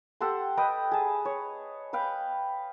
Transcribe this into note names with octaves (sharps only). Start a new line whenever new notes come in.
G4 A4 F#5 C6
B4 D#5 G5
G#4 A5
C#5
B4 F5 G5